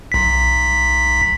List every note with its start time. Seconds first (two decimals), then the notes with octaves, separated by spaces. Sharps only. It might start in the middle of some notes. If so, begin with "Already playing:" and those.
0.12 B1 B6